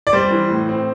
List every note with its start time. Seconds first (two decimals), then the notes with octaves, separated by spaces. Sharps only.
0.07 D5
0.13 G3 C5
0.31 E3
0.51 A2
0.69 C4